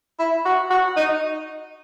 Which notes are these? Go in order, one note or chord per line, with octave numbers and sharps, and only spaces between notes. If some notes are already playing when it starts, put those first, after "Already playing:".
E4
F#4
F#4
D#4